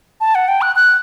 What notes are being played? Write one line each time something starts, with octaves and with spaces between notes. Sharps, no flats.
A5
F#5
G5
F#6
F#6